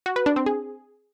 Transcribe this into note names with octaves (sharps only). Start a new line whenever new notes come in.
F#4
B4
D4
C4
G#4